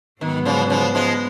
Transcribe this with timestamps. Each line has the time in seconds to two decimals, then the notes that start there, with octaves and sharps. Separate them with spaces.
0.21 G#2 D#3 F#3 B3
0.45 C#3 F3
0.70 C#3 F3
0.95 F3 G#3